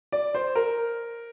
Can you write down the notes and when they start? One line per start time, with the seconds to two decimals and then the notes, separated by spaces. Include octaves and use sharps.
0.12 D5
0.35 C5
0.55 A#4